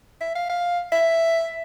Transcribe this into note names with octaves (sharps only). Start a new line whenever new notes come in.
E5
F5
F5
E5